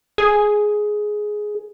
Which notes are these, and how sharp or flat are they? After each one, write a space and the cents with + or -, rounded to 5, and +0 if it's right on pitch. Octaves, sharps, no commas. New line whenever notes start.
G#4 +10